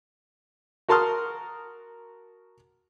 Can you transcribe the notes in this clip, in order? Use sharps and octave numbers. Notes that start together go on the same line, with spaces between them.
F#4 A#4 A5 C6 D#6 F6